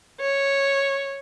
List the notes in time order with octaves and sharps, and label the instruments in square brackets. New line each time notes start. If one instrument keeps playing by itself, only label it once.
[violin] C#5